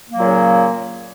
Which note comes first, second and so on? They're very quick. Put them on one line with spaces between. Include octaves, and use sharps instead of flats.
A#3 F#3 A#2 C#3